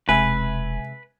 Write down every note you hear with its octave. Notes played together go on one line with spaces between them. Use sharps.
E1 C3 G#3 B4 E5 G#5